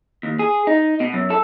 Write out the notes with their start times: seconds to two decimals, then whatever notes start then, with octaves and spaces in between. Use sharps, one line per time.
0.23 D#2
0.39 G#4
0.67 D#4
1.00 B2
1.13 F#2
1.30 A4